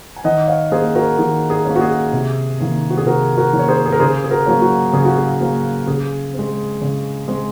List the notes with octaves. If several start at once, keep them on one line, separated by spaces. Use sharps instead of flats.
G#5
D#3 D#5 F#5
C#5 F5
A#3 C#4 G#4 C5
F#4 A#4
D#3 G#4
G#4
A#3 C#4
F#4
G#4
C3
D#3 A#3 C#4
F#4
G#4
C3 F#4 A#4
F#4 A#4
D#3 A#3 C#4
C#5
G#4 C5
G#4
A#4
C#3 G#4 C5
G#4
F#4 A#4
F#3 A#3 C#4
F#4
C#3 G#4
F#4
G#4
F#3 A#3 C#4
C#3 G#4
C4
G#3
C#3
G#3 C4